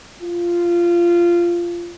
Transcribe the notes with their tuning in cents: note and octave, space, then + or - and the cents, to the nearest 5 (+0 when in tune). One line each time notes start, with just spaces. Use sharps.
F4 -15